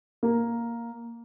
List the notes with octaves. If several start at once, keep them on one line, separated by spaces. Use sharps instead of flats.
A#3